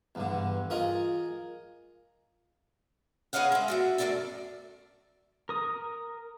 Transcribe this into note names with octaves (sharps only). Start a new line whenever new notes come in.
E2 G2 D3
F4 G#4 A#4 D#5
G#4 B4 C#5 D#5 F5 F#5
G#3 E5
D4 F#4 E5
F#2 A3 C5 D5 E5 A5
A#4 D#6